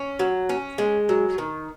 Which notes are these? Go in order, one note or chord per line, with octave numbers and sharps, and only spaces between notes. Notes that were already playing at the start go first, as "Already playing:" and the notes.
Already playing: C#4
F#3
C#4
G#3
F#3
D#3